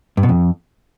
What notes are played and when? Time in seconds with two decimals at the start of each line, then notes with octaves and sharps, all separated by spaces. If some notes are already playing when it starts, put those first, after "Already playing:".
0.17 G2
0.23 B2
0.29 F2